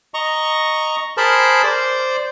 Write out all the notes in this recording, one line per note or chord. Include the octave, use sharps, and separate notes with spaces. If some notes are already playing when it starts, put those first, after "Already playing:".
D#5 A#5 C#6
G#4 A#4 C5 A5 B5
C5 D5